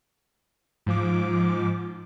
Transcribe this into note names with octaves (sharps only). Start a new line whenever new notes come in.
G#2 F3 D6